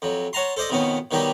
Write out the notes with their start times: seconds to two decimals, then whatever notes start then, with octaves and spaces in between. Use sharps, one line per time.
0.02 F2 F#3
0.33 C#5 F#5 A5 A#5 C6
0.56 A4 C5 D5 D#5
0.70 F2 B2 D#3 B3 C#4
1.11 B2 D#3 F#3 G3 D#4 G4